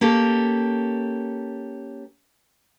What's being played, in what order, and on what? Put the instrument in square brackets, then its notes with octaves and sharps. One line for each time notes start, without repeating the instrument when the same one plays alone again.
[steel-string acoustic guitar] A#3 C#4 G4 A4